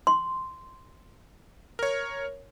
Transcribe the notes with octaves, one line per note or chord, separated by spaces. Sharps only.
C6
A#4 C#5